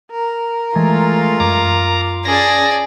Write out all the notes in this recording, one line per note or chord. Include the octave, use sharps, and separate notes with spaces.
A#4
E3 G#3 A3 F4
F#2 A#5 D6
C#4 G#4 D5 A5 A#6